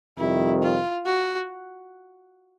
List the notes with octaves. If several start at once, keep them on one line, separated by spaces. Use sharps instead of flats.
F2 C3 D#3 G3 E4
F4
F#4